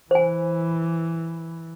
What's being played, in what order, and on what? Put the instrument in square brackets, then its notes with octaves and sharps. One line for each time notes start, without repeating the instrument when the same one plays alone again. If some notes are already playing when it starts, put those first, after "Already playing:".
[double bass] E3 [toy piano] C5 G#5